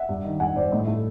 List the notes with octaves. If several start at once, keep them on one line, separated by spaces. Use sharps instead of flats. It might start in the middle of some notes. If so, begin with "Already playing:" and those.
Already playing: E5 F#5
G2
D#3
G2 F#5 G#5
G2 C5 D5
A2 D#5
A3 E5